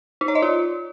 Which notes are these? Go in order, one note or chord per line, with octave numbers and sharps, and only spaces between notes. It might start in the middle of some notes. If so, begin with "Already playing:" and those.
D#4
C#5
D#5
F4